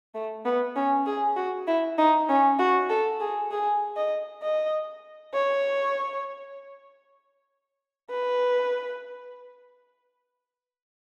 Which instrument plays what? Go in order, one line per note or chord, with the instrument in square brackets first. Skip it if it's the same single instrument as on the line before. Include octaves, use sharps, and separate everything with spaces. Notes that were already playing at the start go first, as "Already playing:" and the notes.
[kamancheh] A3
B3
C#4
G#4
F#4
E4
D#4
C#4
F#4
A4
G#4
G#4
D#5
D#5
C#5
B4